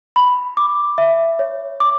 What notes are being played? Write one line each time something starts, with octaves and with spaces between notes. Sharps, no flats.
B5
D6
E5
C#5
D6